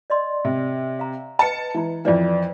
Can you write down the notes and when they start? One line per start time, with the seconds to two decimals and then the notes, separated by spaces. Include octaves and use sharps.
0.10 D5 D#5 C6
0.45 C3
0.99 F5 A#5
1.39 B4 D#5 A5 C#7
1.75 E3 E4 A#5
2.05 F2 E3 B4 D5